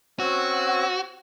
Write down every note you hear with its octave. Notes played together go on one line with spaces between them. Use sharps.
C4 C#4 F#4 E6